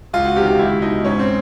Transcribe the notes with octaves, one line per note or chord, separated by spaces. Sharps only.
C#2 F4
F#4
C3 D#3 G4
F4
C#2 E4
B2 D#4
G#2 C#4
C4